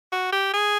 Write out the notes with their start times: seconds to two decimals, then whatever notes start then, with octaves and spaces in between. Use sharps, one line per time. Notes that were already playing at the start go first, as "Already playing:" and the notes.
0.12 F#4
0.32 G4
0.53 G#4